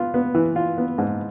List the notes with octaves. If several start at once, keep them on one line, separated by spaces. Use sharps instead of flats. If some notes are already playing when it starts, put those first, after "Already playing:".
Already playing: B3 F4
B3
E3
F4
B3
G#2